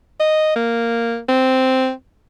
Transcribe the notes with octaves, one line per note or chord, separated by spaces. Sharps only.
D#5
A#3
C4